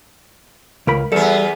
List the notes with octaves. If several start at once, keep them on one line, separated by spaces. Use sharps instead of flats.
C#2 A#4 B5
E2 G3 B3 A4